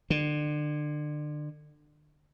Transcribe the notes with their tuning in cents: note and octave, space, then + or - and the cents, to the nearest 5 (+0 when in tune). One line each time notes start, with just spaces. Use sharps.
D3 +30